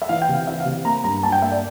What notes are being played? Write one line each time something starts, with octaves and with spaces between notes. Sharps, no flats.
E5
E3 F5
G5
C3
F5
E3 E5
F5
C3
A#3 A#5
G2 A#5
G2 A5
G5
A#3 E5
D5